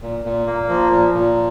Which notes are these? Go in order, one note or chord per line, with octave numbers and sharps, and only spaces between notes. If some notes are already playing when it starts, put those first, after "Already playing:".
A#2
A#2
A#3
F3
A#2
A#2